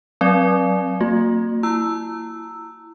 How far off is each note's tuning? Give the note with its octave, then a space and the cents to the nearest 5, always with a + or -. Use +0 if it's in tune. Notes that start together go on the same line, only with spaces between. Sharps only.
F#3 +0 C4 +20 D5 +0
A#3 -30 F#4 -40
E4 +10 A#5 -25 E6 +0